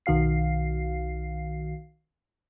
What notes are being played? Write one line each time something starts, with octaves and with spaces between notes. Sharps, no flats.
B1 D#3 F#4 F5 C7